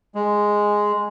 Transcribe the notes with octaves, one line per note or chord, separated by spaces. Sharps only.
G#3